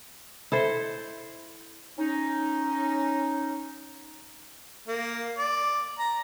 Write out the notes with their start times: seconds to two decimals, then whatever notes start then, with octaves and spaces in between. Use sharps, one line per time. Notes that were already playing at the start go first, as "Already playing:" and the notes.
0.52 E4 A4 C5
1.99 C#4 D#4
4.88 A#3
5.38 D5
5.99 A#5